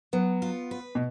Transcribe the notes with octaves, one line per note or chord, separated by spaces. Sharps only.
F#3 B3
F4
B4
B2